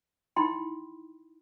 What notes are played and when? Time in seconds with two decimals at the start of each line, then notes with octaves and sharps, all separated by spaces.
0.36 D#4 E4 G5 B5 C6